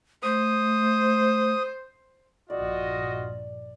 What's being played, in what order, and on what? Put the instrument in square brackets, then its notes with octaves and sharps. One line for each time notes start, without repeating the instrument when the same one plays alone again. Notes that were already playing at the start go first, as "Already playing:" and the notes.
[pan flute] A3 [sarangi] C5 [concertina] D#6
[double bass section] A#1 G2 [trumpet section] F4 F#4 D#5 [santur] D5